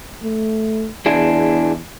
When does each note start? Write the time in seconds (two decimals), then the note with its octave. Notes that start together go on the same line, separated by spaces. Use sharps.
0.23 A3
1.06 E2 D4 E4 G#4